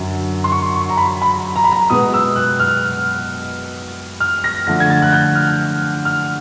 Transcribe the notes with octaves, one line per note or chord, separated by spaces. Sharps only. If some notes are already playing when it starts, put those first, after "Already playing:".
Already playing: F#2 D3 F#3
C6
C#6
C#6
A#5
B5
B5
A#5
B5
A#5
B2 G#3 B3 D#6
E6
F#6
F6
F6
A#6
D3 F3 A3 A#6
G#6
A6
F#6
G6
F6
F6